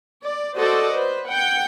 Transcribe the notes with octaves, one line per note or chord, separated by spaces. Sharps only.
D5
F#4 A4 C5 D5 D#5
B4 C5
F#5 G5